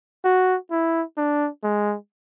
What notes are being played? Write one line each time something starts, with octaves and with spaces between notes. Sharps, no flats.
F#4
E4
D4
G#3